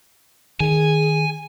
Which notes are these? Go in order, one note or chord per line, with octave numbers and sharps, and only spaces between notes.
D#3 G#4 G#5